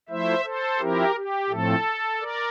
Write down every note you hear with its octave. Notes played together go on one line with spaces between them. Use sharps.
F3 A3 E4 C5 E5
A4 C5
F3 C4 E4 G4 A#4
G4
A2 F3 A3 C4 A4
A#4 D5